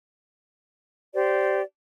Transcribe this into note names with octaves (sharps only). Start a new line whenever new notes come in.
G4 C5 D5